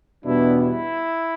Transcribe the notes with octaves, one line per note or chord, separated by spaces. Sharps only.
E2 B2 G3 B3 D4 E4
E4